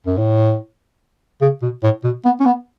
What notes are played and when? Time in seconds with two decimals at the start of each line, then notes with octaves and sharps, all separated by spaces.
0.06 F#2
0.17 A2
1.41 C#3
1.62 B2
1.83 A2
2.04 B2
2.25 B3
2.40 C#4
2.46 B3